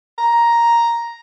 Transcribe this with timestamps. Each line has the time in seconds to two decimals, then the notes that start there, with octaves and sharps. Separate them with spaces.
0.18 A#5